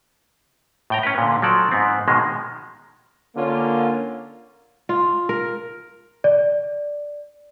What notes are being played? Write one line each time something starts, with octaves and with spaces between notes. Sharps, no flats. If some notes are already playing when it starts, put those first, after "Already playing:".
A2 G5 A#5
C#4 B4
A#2 D3
F3 F#3 A4 D5
G#2 B3 C4
B2 D#3 F3 G#3
D3 A#3 C#4 F4
F4
A#4
D5